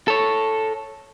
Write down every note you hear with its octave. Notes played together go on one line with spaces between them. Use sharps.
A4 C#5